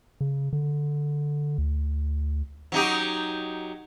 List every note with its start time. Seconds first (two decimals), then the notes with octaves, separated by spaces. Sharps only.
0.21 C#3
0.53 D3
1.58 D2
2.72 F#3 D#4 G4